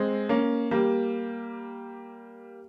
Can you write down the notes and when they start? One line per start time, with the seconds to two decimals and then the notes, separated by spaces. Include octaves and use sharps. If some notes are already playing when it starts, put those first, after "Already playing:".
Already playing: G#3 C4
0.29 A#3 C#4
0.71 G3 A#3